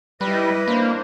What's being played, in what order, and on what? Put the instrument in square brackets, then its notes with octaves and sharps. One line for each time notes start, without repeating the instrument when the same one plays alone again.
[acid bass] G3 [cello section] E4 D#5 [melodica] B4
[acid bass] A#3 [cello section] D4 C5